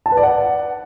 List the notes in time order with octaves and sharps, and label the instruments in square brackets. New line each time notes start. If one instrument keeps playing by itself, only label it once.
[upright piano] A5
B4
D5
F#5